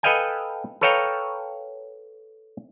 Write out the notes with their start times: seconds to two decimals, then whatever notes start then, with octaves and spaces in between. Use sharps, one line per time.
0.03 A4 B4 D#5 F5 G5 G#5
0.81 A4 B4 C#5 F5 G5 A#5